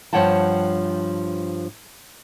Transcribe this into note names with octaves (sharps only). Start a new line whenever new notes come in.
G2 F3 C#5 F#5 G5 A5